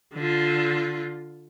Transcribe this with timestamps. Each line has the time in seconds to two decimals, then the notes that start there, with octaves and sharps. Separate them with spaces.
0.14 D3 F4